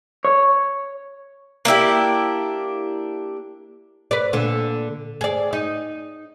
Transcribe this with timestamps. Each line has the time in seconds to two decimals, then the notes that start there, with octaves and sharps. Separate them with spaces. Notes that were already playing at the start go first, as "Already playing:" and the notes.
0.25 C#5
1.65 A#3 D4 E4 G4
4.11 B4 D5
4.33 A#2 D3
5.21 G#4 D5
5.53 D#4